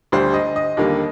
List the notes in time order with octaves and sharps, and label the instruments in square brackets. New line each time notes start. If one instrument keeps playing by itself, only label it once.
[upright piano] D2 D3 G3 C5
D#5
D#5
D#2 D3 G3 A#3